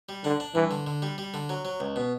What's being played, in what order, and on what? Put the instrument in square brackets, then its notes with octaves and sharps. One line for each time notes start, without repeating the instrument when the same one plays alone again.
[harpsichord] G3
[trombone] D3 [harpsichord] D4
[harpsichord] D4
[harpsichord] G2 [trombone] E3
[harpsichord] D3
D3
G3
G3
D3
F#3
F#3
C#2
B2